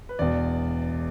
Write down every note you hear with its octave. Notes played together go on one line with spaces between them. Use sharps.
B4
E1 E2 B2 D5